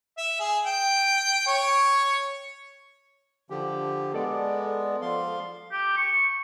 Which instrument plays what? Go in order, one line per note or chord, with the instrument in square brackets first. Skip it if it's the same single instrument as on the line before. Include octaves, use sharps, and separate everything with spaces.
[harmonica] E5
G#4
G5
C#5
[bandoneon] D3 F3 G4
[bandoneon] G#3 B3 [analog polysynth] A4 D5
[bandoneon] F3 F5 C6
[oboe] G4
C#6